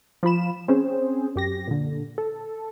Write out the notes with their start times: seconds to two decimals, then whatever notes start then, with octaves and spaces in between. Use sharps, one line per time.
0.23 F3 F4 B5 E7
0.68 C4 C#4 G#4 C5
1.35 F#2 G4 A#6
1.68 A#2 D3
2.18 A4